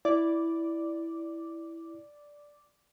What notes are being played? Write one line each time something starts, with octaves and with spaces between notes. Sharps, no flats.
E4 D5